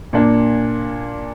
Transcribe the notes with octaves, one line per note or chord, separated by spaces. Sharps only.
A#2 A#3 D4